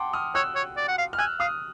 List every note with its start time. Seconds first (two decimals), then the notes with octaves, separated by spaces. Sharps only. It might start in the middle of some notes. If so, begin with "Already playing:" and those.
Already playing: F#5 G5 A5 C6 D6
0.13 D#6 F6
0.35 C#5 E6 F#6
0.56 C#5
0.77 D5
0.88 F#5
0.98 F5
1.13 F6
1.18 G#5 E6 F#6
1.40 F5 D#6 F6